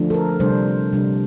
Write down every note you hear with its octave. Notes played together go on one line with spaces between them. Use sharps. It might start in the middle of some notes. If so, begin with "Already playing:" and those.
Already playing: D3 F3 A3 D4
A4
A#4
C3 G3 D4 C5
C3 G3 D4